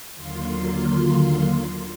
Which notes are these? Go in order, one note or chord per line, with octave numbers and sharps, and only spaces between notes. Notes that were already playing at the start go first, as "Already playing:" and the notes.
D#2 D3 F#3 A#3 F4 C6